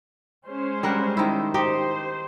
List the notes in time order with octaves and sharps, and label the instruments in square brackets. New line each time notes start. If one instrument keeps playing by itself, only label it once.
[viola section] G#3 C#4 C5
[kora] G3 A#4 F#5
D#3 E4
[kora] D#4 G4 [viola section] C5